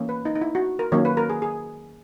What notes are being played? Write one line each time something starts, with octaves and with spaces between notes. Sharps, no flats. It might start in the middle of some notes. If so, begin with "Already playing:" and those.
Already playing: E3 A#3 C#4
B4
D#4
D#4
E4
F#4
A#4
D#3 F#3 A#3 C#4 C#5
B4
A#4
G#4
G#4